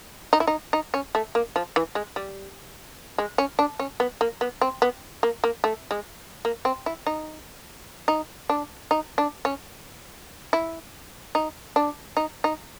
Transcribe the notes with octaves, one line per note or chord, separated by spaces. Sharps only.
D#4
E4
D#4
D#4
C#4
A3
A#3
F3
E3
G#3
G3
G#3
C#4
D4
C#4
B3
A#3
B3
C4
B3
A#3
A#3
A3
G#3
A#3
C4
E4
D#4
D#4
D4
D#4
D4
C#4
E4
D#4
D4
D#4
D#4